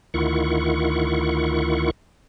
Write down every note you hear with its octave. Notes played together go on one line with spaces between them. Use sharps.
D2 D#3 E4 F4 F#5 C#6